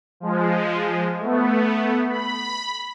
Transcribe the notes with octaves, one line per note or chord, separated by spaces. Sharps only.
F3 G#3
A3 B3
B5